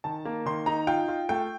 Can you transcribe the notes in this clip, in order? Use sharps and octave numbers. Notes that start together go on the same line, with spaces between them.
D#3 A5
A#3
D#3 C6
D#4 A#5
F4 G5
F4
A3 G5